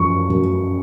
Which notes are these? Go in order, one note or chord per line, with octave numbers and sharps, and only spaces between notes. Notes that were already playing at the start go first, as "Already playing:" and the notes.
Already playing: F#2 F3 C#6
F#2